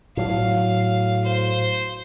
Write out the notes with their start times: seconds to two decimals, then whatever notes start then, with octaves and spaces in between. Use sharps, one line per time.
0.17 A2 F#3 F5
1.25 C5